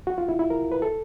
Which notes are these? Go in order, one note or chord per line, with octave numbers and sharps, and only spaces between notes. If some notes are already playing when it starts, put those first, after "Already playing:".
F#4
F4
E4
E4
A#4
B4
A4